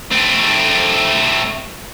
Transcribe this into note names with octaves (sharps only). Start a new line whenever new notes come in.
A3 C4